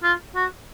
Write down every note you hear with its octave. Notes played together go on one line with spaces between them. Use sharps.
F4
F#4